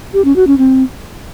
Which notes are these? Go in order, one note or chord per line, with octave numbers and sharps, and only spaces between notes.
G4
C#4
F#4
C#4
C4